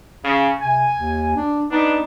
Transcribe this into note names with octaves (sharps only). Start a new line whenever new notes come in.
C#3
C3 G#5
D#2
D4
B3 D4 D#4